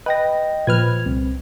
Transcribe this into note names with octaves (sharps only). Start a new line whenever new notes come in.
B4 D#5 G5 A#6
A#2 F3 B4 F6 G#6
C2 C4